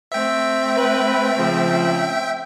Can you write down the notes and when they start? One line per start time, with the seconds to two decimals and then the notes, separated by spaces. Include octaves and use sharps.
0.12 A3 C4 E5 G5
0.77 B4
1.38 C#3 F3